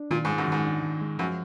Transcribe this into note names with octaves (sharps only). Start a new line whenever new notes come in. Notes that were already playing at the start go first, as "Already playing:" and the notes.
Already playing: D4
A#2 D#3
G#2
G#3
F#2
G#2 D#3
D4
D#3
G#3
F#2 F3